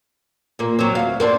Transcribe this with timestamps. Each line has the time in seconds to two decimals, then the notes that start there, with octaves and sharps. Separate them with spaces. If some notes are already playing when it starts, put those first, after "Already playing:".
0.59 A#2 A#3
0.79 F#3 C4
0.95 D2 F5
1.20 A#3 C4 D4